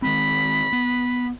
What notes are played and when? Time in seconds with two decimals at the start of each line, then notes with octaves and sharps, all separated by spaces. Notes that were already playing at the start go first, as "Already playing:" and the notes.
0.02 D#3 G#3 C4 B5
0.73 B3